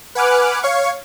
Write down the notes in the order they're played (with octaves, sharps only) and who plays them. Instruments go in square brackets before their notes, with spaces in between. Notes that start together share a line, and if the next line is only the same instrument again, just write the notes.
[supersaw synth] B4 F#5 G#5 D6 F6 F#6
C#5 F5 C#6